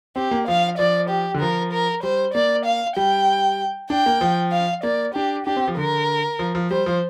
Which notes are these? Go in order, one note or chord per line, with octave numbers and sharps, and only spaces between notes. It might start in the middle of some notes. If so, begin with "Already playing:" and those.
C4 G4
A#3
F3 F5
F3 D5
G4
D3
F3 A#4
A#4
G3 C5
A#3 D5
F5
G3 G5
D4 G5
A#3
F3
F5
A#3 D5
D4 G4
D4 G4
C4
F3
D3 A#4
F3
F3
G3 C5
F3